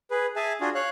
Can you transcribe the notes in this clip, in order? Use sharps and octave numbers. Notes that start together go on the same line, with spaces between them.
G#4 B4
G#4 E5 G#5 A5
D4 F4 F#4 G#4
C#5 F5 F#6